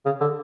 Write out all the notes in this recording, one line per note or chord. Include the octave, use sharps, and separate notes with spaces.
C#3
D3